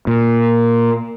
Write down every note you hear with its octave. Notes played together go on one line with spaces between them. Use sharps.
A#2